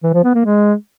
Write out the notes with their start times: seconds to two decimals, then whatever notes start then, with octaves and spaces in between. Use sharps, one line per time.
0.03 E3
0.14 F3
0.24 B3
0.34 A#3
0.45 G#3